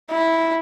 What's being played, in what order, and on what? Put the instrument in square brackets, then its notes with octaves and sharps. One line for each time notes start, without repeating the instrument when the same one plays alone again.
[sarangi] E4